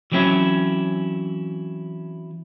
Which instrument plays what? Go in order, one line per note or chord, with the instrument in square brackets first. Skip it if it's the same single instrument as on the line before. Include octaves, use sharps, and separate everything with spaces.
[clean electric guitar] E3 F#3 C4 C#4 E4